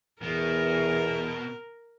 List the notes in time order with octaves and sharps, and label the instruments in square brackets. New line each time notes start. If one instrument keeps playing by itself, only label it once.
[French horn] E2 [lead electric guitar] B2 [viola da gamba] A#4